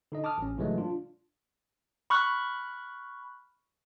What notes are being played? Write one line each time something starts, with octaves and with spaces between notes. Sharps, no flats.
D3 D#4 D#5
A5 D6 D#6 F6
A1 C#4
G#2 C3 E3 F#3 G#3 A3
D4 F4
B5 C#6 F6 F#6